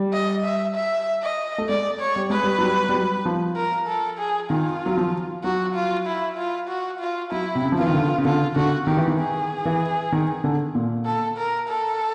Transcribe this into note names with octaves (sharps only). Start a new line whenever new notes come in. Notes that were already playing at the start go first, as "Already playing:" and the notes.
Already playing: G3
D#5
E5
E5
D#5
A3
G#3 D5
C#5
G3
G#3 B4
G3
F#3
G3
G3
F#3
F3
A#4
A4
G#4
D#3 F4
F#3
F3
F#3 F#4
F4
E4
F4
F#4
F4
F#3 E4
C3
C#3
F3
E3 F4
D#3
D3
C#3
D3 F4
D3 F#4
D#3 G4
E3
D#3
G#4
E3
D#3
D3
A#2
A4
A#4
A4